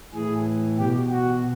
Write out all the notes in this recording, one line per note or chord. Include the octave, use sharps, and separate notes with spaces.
A2 E3 G#4
B2 G4
F#4